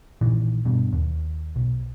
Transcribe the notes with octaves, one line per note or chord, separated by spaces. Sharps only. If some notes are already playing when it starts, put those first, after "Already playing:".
A#1 A#2 D#3 E3
G2 B2
D#2
B1